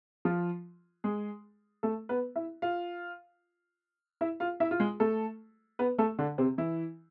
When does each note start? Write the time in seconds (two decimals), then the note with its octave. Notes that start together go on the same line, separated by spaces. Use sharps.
0.25 F3 F4
1.04 G#3 G#4
1.83 A3 A4
2.09 B3 B4
2.36 E4 E5
2.62 F4 F5
4.21 E4 E5
4.40 F4 F5
4.60 E4 E5
4.71 F4
4.80 G#3 G#4
5.00 A3 A4
5.79 B3 B4
5.98 A3 A4
6.19 D3 D4
6.38 C3 C4
6.58 E3 E4